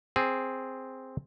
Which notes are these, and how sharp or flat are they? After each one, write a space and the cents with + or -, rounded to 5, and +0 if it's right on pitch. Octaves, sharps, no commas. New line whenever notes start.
C4 +0 G#4 +0